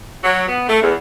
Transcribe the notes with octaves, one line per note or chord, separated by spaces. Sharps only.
F#3
B3
A3
E2